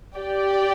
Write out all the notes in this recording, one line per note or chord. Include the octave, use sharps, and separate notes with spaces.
G4 D5 G5